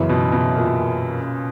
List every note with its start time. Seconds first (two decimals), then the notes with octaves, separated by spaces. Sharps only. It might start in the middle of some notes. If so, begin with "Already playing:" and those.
Already playing: F#2 C#3 E3 B3
0.09 B2
0.32 B2
0.56 A#2